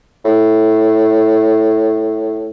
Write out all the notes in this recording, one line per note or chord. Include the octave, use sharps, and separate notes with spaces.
A2